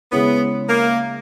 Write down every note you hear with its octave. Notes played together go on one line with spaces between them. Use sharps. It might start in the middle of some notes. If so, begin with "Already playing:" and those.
C#3 G#3 B3 C#4 E4
A#3